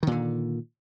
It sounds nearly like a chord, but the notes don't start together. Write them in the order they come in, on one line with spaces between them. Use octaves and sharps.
D#3 A#2 D3